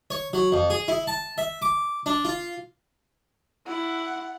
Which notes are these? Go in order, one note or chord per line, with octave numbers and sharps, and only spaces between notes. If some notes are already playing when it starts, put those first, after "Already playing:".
C#5
F#3
F2
G#4
E4
A5
E5
D6
D4
F4
E4 F#5